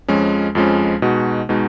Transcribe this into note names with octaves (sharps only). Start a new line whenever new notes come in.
F2 F3 G#3 C#4
F2 F3 G#3 C#4
B2 G#3 D#4 F#4
B2 G#3 D#4 F#4